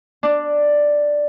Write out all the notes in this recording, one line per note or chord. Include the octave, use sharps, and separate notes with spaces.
D4